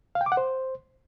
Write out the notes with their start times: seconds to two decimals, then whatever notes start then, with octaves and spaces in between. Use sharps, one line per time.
0.15 F5
0.21 G5
0.26 D6
0.32 F#5
0.37 C5